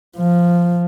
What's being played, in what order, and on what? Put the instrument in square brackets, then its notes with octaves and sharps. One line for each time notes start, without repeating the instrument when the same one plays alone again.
[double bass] F3